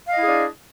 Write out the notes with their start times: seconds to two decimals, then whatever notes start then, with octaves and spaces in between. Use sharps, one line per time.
0.07 F5
0.12 D#5
0.16 E4
0.21 G#4
0.26 D4